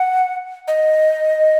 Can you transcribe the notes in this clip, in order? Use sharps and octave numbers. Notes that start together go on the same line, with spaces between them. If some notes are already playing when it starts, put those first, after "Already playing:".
Already playing: F#5
D#5